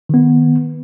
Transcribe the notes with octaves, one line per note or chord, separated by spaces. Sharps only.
D#3 B3